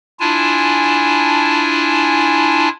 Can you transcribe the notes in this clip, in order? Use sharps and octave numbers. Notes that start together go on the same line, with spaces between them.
D4 E4 F4 G#5 A5